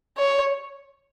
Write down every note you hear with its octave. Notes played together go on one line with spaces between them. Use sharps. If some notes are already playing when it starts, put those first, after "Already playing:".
C#5